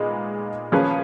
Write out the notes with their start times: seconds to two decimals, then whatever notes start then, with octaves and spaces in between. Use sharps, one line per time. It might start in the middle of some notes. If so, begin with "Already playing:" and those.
Already playing: A#2 G#3 B3 D#4
0.72 F3 A#3 C#4 G#4 B4